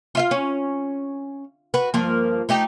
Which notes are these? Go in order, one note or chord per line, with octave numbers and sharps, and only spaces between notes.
F4 E5 F5
C#4
F#4 B4
G2 F3 A#3
A3 D#4 G4